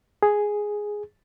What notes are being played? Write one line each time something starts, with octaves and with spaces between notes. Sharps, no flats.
G#4